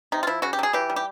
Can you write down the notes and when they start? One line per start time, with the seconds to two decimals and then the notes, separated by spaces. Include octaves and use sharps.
0.12 C3 D#4
0.23 F4
0.27 F3 E4
0.42 C#3 F#4
0.53 G4
0.59 F#3 G#4
0.73 E3 G4
0.90 G3
0.96 G4